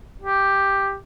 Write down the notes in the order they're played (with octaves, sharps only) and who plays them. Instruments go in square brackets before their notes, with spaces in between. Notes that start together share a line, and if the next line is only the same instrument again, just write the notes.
[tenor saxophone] G4